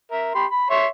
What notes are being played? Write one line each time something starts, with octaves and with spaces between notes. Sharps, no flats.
A#4 E5
G4 B5 C6
B5
C#5 E5 C6